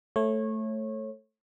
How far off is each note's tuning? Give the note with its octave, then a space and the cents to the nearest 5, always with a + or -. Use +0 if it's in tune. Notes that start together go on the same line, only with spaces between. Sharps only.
A3 +0 C#5 -25